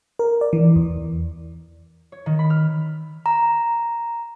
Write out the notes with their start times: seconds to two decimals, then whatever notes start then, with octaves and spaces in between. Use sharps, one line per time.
0.19 A#4
0.41 D5
0.53 E3
0.76 E2
2.12 C#5
2.26 D#3
2.39 B5
2.50 F6
3.26 A#5